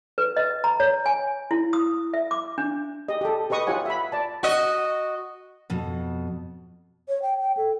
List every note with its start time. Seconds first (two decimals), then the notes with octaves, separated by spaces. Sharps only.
0.18 B4
0.37 D#5
0.64 A#5
0.80 C#5
1.06 G#5
1.51 E4
1.73 D#6
2.14 E5
2.31 D6
2.58 D4
3.08 G4 D#5
3.21 G4 A4
3.50 G4 B4 D#5 C#6 D#6
3.67 F4 G4 C#5 F#5 G#5
3.86 E5 B5
4.12 D5 A5
4.43 F#4 D#5
5.70 F2 B2
7.09 C#5
7.22 G5
7.40 G5
7.57 A4